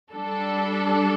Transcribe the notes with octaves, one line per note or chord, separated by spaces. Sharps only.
G3 D4 A4